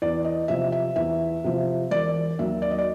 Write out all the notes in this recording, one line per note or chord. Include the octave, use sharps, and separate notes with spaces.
E2 D5
D#5
C3 F3 E5
E5
E2 E5
C3 F3
E1 D5
D#2 D#3 F#3 E5
D5
D#5
D5